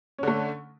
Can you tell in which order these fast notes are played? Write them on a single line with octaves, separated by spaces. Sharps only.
C#4 D3 A3